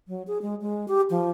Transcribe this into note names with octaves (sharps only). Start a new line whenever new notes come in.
F#3
G#4
G#3
G#3
G4
F3